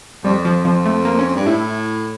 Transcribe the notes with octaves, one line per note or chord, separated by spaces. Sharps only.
F2 G3
F3
F2 F3
A3
A#3
C#4
G2
A2 E4